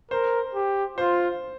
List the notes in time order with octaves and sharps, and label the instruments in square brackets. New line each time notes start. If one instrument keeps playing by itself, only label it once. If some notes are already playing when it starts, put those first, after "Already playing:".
[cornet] A#4 [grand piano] C5
[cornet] G4
[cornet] F4 [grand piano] C5